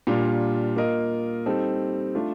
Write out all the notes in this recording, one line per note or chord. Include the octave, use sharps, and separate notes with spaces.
A#2 G3 D4 F4 A#4
A#3 F4 A#4 D#5
G3 C4 D#4 A4
A3 D4 F4